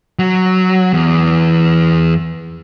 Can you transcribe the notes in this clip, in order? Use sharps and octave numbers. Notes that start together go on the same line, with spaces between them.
F#3
E2